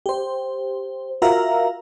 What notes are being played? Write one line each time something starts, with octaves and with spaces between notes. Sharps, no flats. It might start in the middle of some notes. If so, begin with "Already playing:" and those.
G4 C5
F4 F#4 A#4 E5 F5 A#5